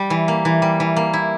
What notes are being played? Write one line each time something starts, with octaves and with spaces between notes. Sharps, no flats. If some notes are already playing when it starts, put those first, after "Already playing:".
Already playing: G3
E3
A#3
E3
G3
E3
A#3
E4